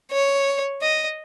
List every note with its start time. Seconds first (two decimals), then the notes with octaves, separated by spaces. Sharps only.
0.12 C#5
0.81 D#5